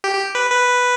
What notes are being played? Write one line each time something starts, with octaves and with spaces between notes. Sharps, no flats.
G4
G4
B4
B4